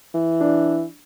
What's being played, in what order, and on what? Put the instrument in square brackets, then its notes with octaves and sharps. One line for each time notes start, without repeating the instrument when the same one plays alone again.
[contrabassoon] E3
[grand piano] D4